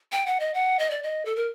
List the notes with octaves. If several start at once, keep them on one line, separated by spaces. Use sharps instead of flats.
G5
F#5
D#5
F#5
D#5
D5
D#5
A4
A#4